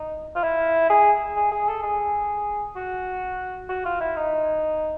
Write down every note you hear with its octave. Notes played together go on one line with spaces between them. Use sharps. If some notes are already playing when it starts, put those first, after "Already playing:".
Already playing: D#4
F4
E4
G#4
G#4
G#4
A4
G#4
F#4
F#4
F4
E4
D#4